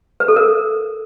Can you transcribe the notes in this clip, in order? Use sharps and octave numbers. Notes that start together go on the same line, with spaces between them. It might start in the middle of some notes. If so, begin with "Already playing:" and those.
B4
A4
A#4